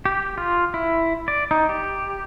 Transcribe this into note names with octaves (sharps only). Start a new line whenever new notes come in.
G4
F4
E4
D5
D#4
G4